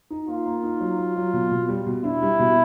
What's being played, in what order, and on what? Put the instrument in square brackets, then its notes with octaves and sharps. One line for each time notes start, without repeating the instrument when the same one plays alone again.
[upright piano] D#4
[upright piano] A#3 [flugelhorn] F4
[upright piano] A#3
D#4
F#3
F#3
F#3
B2
B2
G3
B2
[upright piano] D4 [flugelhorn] E4
[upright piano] G3
B2